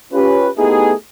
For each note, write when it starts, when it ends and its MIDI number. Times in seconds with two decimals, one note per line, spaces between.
0.13 0.48 61
0.13 0.48 65
0.13 0.48 67
0.13 0.48 71
0.57 0.92 57
0.57 0.92 59
0.57 0.92 63
0.57 0.92 64
0.57 0.92 67
0.57 0.92 68